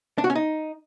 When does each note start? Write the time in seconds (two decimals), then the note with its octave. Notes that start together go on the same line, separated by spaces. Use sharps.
0.18 D4
0.24 F#4
0.30 C#4
0.35 D#4